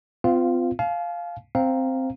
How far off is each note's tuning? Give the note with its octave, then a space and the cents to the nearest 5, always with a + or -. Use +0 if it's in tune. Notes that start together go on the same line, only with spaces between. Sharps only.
C4 -40 F4 +0 F5 -15
F5 +0 A5 -45
C4 +0 F5 +0 A#5 -5